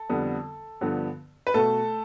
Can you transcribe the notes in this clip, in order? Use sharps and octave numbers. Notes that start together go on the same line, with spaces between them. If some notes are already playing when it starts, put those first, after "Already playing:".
Already playing: A4
F2 D3 G3 B3
G2 D3 F3 B3
B4
B2 A3 A4